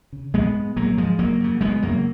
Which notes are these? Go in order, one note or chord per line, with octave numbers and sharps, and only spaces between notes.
C#3
A#1 G#3 B3
G#2
A#1 F#3 A#3
G#2 F3 G#3
F#1 F#3 A#3
F#2 C#3
F#1 G#3 B3
F#2 C#3 F#3 A#3